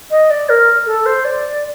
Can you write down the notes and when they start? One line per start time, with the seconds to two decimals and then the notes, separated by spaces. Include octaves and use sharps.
0.11 D#5
0.30 D5
0.49 A#4
0.86 A4
1.06 C5
1.25 D5